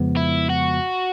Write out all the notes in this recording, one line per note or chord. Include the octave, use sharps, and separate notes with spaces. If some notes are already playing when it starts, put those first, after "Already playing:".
Already playing: F2 C#3 F3 G#3 B3
E4
F#4